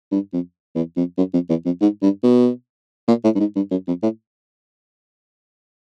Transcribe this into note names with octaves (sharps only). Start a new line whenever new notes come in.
G2
F2
E2
F2
F#2
F2
E2
F2
G#2
G2
B2
A#2
A2
G2
G#2
G2
F#2
F2
A2